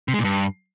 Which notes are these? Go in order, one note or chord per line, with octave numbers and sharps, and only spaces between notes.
C3
G#3
A#2
G2